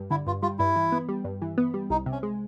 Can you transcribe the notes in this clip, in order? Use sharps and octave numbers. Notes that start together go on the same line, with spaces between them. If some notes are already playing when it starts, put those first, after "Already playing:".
Already playing: G2 G3
D3 E4
G2 F4
G3 F4
G2 E4
E3
B3
G3
G2
E3
B3
G3
C2 D#4
C3
C#4
G#3